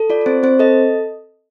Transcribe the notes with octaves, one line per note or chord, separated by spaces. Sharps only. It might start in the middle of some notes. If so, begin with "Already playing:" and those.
Already playing: A4
F4 D5
D5
C4 C5
C4 C5
A4 D#5